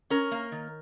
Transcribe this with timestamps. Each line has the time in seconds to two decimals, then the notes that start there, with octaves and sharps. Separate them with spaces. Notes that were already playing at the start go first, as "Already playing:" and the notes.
0.10 C#4 A#4
0.31 A#3
0.52 D#3